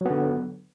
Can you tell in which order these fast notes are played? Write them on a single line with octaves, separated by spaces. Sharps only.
F#3 B3 D3